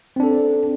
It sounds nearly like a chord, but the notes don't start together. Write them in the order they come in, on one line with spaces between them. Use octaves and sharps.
C4 D4 A4